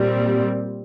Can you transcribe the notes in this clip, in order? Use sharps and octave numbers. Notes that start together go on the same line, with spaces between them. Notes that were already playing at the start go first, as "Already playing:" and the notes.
Already playing: A#2 G3 C4